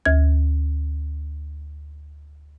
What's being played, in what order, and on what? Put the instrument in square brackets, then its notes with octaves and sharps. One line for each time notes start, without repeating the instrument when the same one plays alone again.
[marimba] D2 G#6